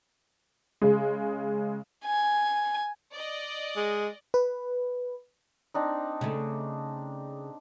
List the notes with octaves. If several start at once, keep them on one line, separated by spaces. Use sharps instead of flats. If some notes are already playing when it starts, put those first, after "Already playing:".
C#3 G#3
G#5
D5 D#5
G#3
B4
C4 D4 D#4
C#3 A3